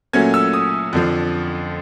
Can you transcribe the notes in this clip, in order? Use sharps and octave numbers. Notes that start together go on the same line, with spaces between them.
A#2 F#3 A3 C#4 G#6
E6
D#6
F2 D3 F3